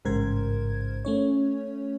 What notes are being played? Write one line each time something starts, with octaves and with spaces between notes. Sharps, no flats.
A1 G#2 C#3 A#4 C5 G#6
A3 C#4 C#5